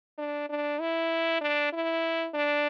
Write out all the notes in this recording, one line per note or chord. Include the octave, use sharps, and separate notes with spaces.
D4
D4
E4
D4
E4
D4